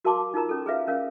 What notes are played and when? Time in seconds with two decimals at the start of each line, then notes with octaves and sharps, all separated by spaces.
0.05 F#4 A#4 F5 A5 C6 D6
0.34 D#4 F4 A#4 A#5
0.49 C#4 A4
0.66 G#4 B4 E5 F5
0.87 C#4 A#4 F5